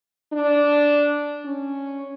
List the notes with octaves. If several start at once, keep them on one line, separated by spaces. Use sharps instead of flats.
D4
C#4